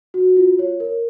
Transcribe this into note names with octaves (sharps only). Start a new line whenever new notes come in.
F#4
F4
C#5
A#4